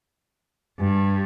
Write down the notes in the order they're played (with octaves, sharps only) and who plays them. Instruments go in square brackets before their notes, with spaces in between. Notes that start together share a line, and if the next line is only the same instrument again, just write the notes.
[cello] G2